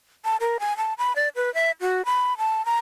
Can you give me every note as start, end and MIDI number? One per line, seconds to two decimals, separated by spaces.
0.25 0.36 81
0.41 0.57 70
0.60 0.76 80
0.77 0.93 81
0.98 1.15 83
1.16 1.28 74
1.36 1.52 71
1.54 1.71 76
1.81 2.05 66
2.05 2.37 83
2.38 2.64 81
2.65 2.78 82